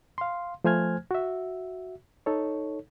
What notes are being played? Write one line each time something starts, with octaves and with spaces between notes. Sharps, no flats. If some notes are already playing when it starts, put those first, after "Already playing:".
F5 C6
F3 A3 C5 G#5 F6 G#6
F#4 E5
D#4 A4 C#5